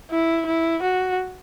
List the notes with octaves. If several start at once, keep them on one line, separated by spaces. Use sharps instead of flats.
E4
E4
F#4